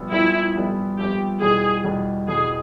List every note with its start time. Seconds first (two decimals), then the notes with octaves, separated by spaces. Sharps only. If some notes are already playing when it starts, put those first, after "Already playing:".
Already playing: A#1 A#2 G3 B3
0.12 A#1 A#2 G3 B3 E4
0.55 A#1 A#2 G3 B3
0.98 A#1 A#2 G3 B3 G4
1.41 E2 B2 G3 G#4
1.84 E2 B2 G3
2.28 E2 B2 G3 G#4